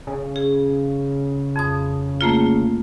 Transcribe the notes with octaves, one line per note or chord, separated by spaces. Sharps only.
C#3
G#4
F2 D#6
A3 A#3 F4